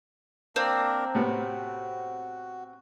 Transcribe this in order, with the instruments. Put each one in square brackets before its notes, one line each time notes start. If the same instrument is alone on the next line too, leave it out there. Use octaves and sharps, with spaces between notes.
[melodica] A#3 D4 A#4 [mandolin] C4
[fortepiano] A2 C3 B3 [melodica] F#4